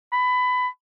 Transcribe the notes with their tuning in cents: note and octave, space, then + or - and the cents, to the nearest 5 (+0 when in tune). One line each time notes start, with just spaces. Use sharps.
B5 +20